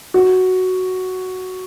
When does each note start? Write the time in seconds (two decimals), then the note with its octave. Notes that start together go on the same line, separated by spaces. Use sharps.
0.14 F#4